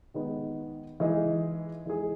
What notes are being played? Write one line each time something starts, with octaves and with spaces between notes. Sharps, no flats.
D#3 G#3 B3 D#4
E3 G#3 D#4 G#4
E3 G#3 D#4 G#4